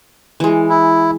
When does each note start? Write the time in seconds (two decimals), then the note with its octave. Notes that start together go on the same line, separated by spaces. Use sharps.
0.40 E3 G#3
0.69 E4